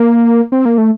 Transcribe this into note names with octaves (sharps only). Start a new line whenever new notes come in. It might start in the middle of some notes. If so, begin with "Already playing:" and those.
Already playing: A#3
C4
A#3
A3